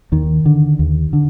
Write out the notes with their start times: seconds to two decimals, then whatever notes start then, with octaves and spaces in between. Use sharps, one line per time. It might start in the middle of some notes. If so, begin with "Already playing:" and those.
0.12 D#2 D#3
0.46 D3
0.79 D#2
1.13 D3